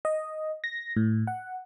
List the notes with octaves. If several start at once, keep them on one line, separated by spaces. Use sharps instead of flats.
D#5
A#6
A2
F#5